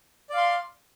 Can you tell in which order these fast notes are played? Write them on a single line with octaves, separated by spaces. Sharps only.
D5 F5 C6